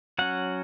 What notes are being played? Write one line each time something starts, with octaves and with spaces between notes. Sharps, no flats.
F#3 C#4 F#5